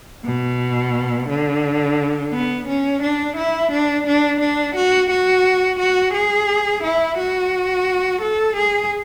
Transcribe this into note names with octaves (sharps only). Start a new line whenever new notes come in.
B2
D3
B3
C#4
D4
E4
D4
D4
D4
F#4
F#4
F#4
G#4
E4
F#4
A4
G#4